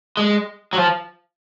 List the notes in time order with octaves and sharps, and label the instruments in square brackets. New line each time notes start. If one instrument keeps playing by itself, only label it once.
[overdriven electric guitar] G#3
F#3
F3